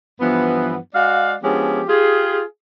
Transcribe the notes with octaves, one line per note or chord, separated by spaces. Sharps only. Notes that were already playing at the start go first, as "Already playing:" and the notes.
G2 E3 F3 B3
G#3 F#4 D5 F5
F3 G#3 B3 C#4 D4 G4
F4 G4 G#4